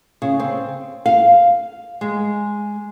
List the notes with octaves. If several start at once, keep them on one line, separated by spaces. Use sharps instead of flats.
C#3
C4
F5
G#3